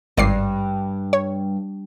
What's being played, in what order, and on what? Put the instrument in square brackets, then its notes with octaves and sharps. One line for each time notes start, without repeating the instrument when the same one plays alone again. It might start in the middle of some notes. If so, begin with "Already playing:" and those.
[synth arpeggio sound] G#1 D5 C7 [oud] G2
[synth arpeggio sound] C#5